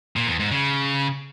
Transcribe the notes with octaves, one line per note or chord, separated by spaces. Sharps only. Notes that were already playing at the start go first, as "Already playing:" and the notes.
A#2
E2
G#2
C#3